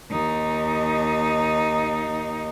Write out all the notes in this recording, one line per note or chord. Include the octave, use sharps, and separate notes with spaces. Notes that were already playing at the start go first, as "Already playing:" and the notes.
D#2 D#4